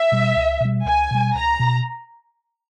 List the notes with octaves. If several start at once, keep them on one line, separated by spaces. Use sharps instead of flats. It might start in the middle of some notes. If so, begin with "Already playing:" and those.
Already playing: E5
B2 G3
C#2
B2 G3
C#2 G#5
B2 G3
C#2 A#5
B2